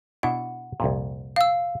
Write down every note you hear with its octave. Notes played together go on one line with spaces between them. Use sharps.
B2 D4 E4 F#5
C2 F2 A#2
F5 E6